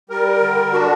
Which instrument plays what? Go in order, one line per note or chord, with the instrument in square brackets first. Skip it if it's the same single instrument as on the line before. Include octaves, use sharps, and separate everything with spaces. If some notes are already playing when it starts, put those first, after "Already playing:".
[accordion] G3 A#4
D3
D4 F#4